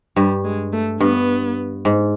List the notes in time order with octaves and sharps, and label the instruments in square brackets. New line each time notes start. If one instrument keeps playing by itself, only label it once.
[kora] G2 [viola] G3
[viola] G#3
A3
[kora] G2 [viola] B3
[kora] G#2